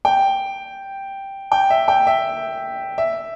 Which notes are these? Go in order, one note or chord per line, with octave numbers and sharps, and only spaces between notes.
G5
G5
E5
G5
E5
E5